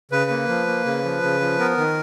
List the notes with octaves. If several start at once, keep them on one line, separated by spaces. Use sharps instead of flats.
C#3 B4
A#3
F3
A#3
C#3
F3
C#3
F3
B3 A#4
D#3